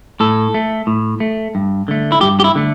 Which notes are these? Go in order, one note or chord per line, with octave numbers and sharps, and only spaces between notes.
A2 A4
A3
A2
A3
G2
D3 A3
E4
G2 G4
G4
E4
D3 A3